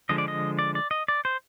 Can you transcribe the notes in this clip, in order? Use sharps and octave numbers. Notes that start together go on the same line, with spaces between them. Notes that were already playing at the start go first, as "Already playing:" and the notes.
D3 F3 G#3 D#5
D5
D#5
D5
D5
D#5
D5
C5